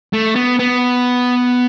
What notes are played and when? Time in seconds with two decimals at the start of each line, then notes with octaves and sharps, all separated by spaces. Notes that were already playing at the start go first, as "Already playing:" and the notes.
0.13 A3
0.36 B3
0.59 B3